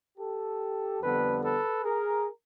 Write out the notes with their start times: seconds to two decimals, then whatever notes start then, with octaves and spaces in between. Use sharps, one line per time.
0.18 G4 A4
1.00 F2 D3 G3 B3 A4 B4
1.42 A4 B4
1.83 G#4 A#4